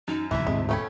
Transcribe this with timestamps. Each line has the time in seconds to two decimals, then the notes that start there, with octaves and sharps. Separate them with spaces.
0.08 F#2 D#4
0.31 D1 C2 E3 E4 E5
0.47 D1 F2 G#2 C3 G#3 C4 E4
0.69 B2 A3 C#4 A4 G5 B5 G#6